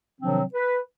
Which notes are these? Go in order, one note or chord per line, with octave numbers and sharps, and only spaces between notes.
C3 D#3 F3 F#3 C4 D4
B4